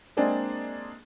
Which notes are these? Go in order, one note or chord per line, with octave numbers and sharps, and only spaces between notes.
G#3 A#3 C4 D4 G#4